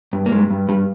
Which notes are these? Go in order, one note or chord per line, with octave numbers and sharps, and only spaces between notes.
G2
A#3
G2 G#3
G2
G2 G3